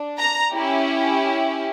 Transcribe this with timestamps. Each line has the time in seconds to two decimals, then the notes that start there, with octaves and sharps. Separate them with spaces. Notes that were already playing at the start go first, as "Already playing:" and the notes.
Already playing: D4
0.19 A#5
0.52 C#4 E4 G4